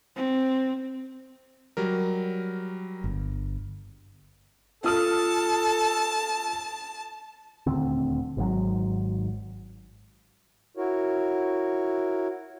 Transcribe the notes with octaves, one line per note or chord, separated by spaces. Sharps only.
C4
F#3 G3 A#4
G1
F4 A4 A5 D#6 F6
D#1 D2 D3 C4
G#1 G#2 B2 F#3
E4 F#4 A#4 C#5